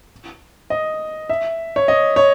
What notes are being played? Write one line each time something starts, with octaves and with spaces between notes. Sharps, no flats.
D#5
E5
C#5
D#5
C#5